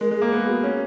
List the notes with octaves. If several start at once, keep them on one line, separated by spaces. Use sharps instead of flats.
G#3 A#4
G#3 G#4
A#3
B3 G#4
F#4
C#4